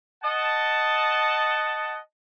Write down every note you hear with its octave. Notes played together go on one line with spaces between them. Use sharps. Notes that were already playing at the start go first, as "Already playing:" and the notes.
D#5 F#5 A5